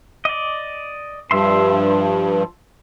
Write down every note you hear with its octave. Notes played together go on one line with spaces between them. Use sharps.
D5 D#5
G2 F3 E5 C6